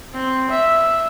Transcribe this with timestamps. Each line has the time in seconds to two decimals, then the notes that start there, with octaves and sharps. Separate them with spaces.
0.14 C4
0.51 E5